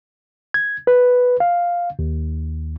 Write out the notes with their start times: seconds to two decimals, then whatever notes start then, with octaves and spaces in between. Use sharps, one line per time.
0.54 G#6
0.87 B4
1.40 F5
1.99 D#2